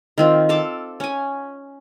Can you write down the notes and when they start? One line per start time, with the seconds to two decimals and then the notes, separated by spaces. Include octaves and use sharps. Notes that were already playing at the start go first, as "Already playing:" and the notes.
0.18 D#3 C4 F4
0.49 A4 F5 A5 D6
1.00 C#4 G#5